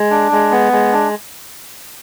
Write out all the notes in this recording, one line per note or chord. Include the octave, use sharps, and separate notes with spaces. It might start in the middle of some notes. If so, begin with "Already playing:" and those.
Already playing: G#3
D4
G#3
B3
G#3
D4